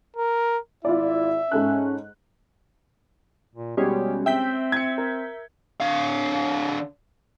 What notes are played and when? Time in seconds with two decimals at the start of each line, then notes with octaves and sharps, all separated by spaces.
0.17 A#4
0.85 G#1 E4 F4 D5 E5
1.51 G#2 C#4 A4 F#6
3.55 A#2
3.77 B2 G3 G#3 C#4 G4
4.26 C4 E5 G5 G6 B6
4.72 G#6 C#7
4.98 A#4
5.81 D3 F5